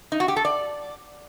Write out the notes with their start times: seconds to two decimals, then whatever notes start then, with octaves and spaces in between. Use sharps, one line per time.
0.12 D#4
0.20 F#4
0.28 G4
0.36 A4
0.45 D5